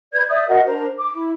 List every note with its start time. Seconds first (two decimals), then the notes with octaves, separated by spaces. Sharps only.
0.13 B4 D5 G6 G#6
0.29 D5 E5 D#6 G6
0.48 F#4 A#4 D#5 F#5
0.66 D4 A#4 C5 A#5
0.97 D6
1.11 E4